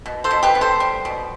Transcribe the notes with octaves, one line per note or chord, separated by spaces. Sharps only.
B2
A4 C5
B2
G4 B4
B3
A4 C5
G3
B2